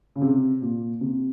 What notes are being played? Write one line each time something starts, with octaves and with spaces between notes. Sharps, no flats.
C#3
C3
A#2
C3